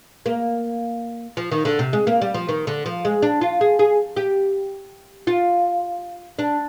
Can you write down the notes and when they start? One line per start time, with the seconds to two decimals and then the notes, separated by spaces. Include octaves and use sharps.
0.26 A#3
1.37 F3
1.51 D#3
1.65 D3
1.79 C3
1.93 G#3
2.07 A#3
2.22 G3
2.34 F3
2.49 D#3
2.67 D3
2.86 F3
3.05 G#3
3.22 D4
3.41 F4
3.61 G#4
3.79 G#4
4.17 G4
5.27 F4
6.39 D4